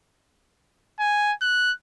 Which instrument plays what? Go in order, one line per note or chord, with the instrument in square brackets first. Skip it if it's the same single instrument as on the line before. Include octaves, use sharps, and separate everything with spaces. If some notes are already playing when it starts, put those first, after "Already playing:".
[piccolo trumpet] G#5
F#6